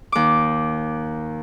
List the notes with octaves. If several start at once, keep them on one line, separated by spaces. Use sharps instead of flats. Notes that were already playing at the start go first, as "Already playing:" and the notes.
D#2 D6